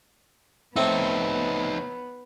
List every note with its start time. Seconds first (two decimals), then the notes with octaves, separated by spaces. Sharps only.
0.76 A2 B3 C4 D#4 C#5